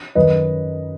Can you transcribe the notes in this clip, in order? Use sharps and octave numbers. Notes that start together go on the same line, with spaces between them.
F#2 D#3 F#3 B4 D#5